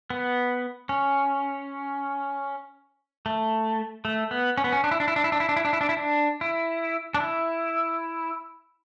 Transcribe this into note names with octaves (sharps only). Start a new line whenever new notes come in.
B3
C#4
A3
A3
B3
C#4
B3
C#4
D4
E4
D4
E4
D4
E4
D4
E4
D4
E4
D4
E4
D4
E4
D4
E4
D4
E4